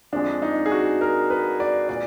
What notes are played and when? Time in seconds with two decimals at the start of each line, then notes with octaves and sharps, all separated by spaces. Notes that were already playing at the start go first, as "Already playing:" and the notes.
0.13 F2 F3 G#3 D4
0.42 D#4
0.66 G#4
0.72 F#4
1.01 A#4
1.30 B4
1.60 D5
1.89 A#2 D5